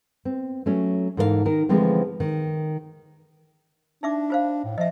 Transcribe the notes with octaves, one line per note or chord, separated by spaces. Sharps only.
C4
F#3 A3 C#4
G#2 E3 A4 A#4 C5 F5
D#3 A#4
D3 E3 F3 G#3 A3 C4
D#3
D4 D#4 E5 D6
F4 C5 F5
A2
F3 D#5 E5